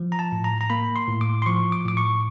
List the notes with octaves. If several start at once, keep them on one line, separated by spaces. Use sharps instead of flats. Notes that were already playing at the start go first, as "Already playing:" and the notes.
Already playing: F3
A#5
A5
A2
A#5
A#5
A#3 B5
C6
A2
D6
C6
F3 C#6
D6
A2 D6
C#6